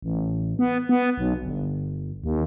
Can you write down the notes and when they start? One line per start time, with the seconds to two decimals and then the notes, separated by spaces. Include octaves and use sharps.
0.02 A1
0.59 B3
0.89 B3
1.18 B1
1.43 G1
2.24 D#2